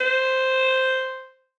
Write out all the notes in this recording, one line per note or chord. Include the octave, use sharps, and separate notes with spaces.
C5